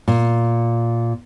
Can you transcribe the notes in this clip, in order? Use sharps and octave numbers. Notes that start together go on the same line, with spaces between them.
A#2